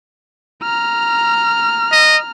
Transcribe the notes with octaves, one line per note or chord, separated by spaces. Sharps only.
A#5 F6
D#5